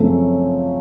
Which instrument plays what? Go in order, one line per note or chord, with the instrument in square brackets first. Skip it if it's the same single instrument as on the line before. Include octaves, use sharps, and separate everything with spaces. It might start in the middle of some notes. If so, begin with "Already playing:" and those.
Already playing: [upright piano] F#2 C#3 F3 A3 C4